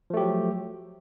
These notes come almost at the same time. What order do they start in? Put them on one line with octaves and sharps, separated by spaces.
F3 A3 G4 F#3